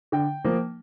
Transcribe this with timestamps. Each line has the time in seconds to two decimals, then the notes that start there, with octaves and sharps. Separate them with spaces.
0.12 D3 G5
0.44 F3 A#3